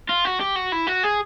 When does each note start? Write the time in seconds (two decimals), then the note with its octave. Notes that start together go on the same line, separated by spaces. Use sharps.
0.09 F4
0.25 F#4
0.41 G4
0.56 F#4
0.72 E4
0.87 F#4
1.04 G#4